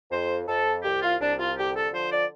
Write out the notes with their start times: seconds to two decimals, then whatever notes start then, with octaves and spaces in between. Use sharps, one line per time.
0.11 F2 C5
0.47 F2 A4
0.84 C2 G4
1.02 F4
1.20 C2 D4
1.39 F4
1.57 D3 G4
1.75 A4
1.93 F3 C5
2.11 D5